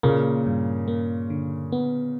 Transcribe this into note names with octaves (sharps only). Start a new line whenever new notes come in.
A#2 C#3 A#3
G2
A#3
D3
B3